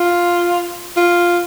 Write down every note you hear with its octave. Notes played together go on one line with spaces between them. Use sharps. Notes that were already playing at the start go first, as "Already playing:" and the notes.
Already playing: F4
F4